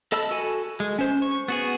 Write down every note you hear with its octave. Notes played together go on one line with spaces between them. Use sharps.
A4 D#5 A5 B5 E6
F#4 A4 G#5
G#3
C#4 C5
C#6
B3 F#4 G#4